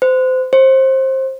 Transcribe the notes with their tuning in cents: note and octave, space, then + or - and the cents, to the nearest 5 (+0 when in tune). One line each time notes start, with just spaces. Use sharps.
C5 -30
C5 +20